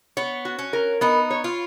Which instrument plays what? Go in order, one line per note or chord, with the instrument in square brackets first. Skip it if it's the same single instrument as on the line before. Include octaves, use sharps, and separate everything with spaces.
[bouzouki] B3 [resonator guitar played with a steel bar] C#5
[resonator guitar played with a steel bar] F#4
[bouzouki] C#4
[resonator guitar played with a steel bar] A#4
[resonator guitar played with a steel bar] B3 [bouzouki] D#4
[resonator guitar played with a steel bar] C#5
[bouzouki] F4